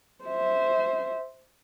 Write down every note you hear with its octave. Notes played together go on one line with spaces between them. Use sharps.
C5 E5